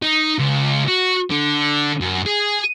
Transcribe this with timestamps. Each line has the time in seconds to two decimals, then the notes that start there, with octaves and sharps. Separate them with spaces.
0.03 D#4
0.39 C#2
0.88 F#4
1.31 D3
2.01 F#2
2.26 G#4